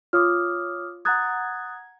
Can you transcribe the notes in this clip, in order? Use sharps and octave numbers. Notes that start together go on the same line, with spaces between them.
F4 C#5 D6 D#6 F6
F#5 A#5 D#6 F#6 G#6 A6